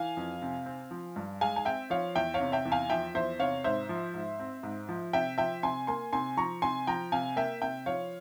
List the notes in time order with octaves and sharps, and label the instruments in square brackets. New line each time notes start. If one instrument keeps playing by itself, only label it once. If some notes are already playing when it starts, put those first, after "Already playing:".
Already playing: [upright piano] E3 F5 G#5
F2
C3
C4
F3
G2
G#3 F5 G#5
G#5
C4 E5 G5
F3 C#5 F5
E2 E5 G5
C#5 F5
C3
E5 G5
E2
F5 G#5
F3 E5 G5
E2 C5 E5
C3 C#5 F5
G#2 C5 E5
F3
G#2
C4
G#2
F3
C3 E5 G5
F3 E5 G5
C3 G#5 C6
A#3 G#5 C6
C3 G#5 C6
F3 A#5 C#6
C3 G#5 C6
F3 G5 A#5
C3 F5 G#5
A#3 E5 G5
C3 E5 G5
F3 C#5 F5